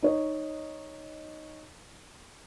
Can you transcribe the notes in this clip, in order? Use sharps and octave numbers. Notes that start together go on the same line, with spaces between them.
D#4 C#5 D#5